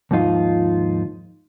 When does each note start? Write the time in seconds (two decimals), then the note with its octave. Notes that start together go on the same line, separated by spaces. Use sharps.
0.11 D#2 G#2 F3 D#4 F4